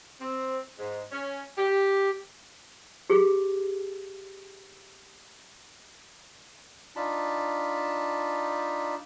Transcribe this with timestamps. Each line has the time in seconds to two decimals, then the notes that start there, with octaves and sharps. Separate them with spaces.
0.19 C4
0.78 G#2
1.12 C#4
1.58 G4
3.10 G4 G#4
6.96 D4 D#4 F4 A5 B5